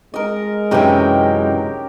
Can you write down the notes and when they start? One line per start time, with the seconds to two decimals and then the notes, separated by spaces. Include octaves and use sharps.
0.14 G#3 A#4 D#5
0.71 F#2 C3 E3 C#4 D#4 G4 A#4 G5